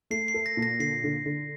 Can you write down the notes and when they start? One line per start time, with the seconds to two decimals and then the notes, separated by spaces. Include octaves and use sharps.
0.10 A3 C7
0.28 C7
0.34 A4
0.46 A#6
0.57 A#2
0.62 A#6
0.79 D3 C7
1.04 D3
1.26 D3